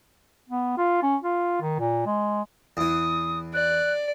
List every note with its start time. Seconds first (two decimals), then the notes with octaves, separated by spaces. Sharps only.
0.49 B3
0.78 F4
1.03 C#4
1.23 F4
1.61 D#3
1.79 A#2
2.06 G#3
2.77 E2 E3 D#6
3.54 D5 F#6